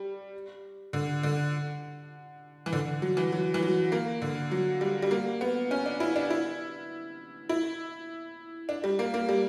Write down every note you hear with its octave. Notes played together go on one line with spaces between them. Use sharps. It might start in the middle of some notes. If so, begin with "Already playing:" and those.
Already playing: G3
D3
D3
E3
D3
F#3
E3
F#3
E3
F#3
A#3
D3
F#3
G3
G3
A#3
B3
C#4
D4
E4
D4
E4
E4
D4
G3
A#3
A#3
G3